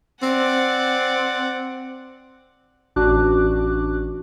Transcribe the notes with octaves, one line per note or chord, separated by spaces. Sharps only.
C4 D5 F#5
A1 D4 F#4 D6 F#6